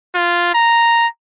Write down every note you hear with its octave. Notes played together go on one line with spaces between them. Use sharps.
F4
A#5